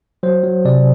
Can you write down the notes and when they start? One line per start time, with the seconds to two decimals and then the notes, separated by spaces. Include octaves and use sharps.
0.23 F#3 C5
0.44 F#3
0.65 C3 D5